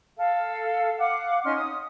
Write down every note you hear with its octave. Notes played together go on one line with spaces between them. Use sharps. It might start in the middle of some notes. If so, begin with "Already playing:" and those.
A4 F5
F5 F#5 D6
C#4 D#4 C6 F6
D#6